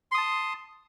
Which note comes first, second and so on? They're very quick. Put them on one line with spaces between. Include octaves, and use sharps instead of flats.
C6 D#6 A5